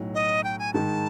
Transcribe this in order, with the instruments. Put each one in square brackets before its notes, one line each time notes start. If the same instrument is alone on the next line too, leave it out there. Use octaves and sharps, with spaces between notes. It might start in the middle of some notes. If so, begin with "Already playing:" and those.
Already playing: [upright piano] B1 A2 F#3
[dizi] D#5
G5
G#5
[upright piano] G#2 D#3 G#3 [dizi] A5